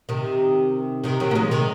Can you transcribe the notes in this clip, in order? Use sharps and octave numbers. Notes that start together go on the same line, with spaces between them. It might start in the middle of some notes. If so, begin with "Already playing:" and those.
C3 D#3
C3 D#3
D#3 F#3
A#3
F3 G#3
C3 D#3